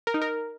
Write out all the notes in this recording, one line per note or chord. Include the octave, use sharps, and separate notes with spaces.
A#4
D#4
A#4